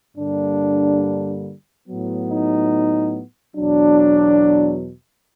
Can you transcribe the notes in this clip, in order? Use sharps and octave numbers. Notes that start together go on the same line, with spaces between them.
G2 D3 G3 A#3 D4
A2 F#3 B3
D#4
E2 B2 F#3 D4